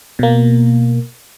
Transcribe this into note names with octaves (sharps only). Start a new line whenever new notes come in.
B2 A#3